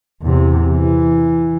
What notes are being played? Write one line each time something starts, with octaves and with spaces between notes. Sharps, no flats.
E2 C3
E3